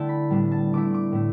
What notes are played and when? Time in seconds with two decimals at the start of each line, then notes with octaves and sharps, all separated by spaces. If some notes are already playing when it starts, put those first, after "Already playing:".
Already playing: D3 A3 E4 G5 A5
0.09 B5
0.30 A2 G3 B3 D4
0.52 A5
0.73 D3 A3 E4 D6
0.94 D6
1.12 A2 A3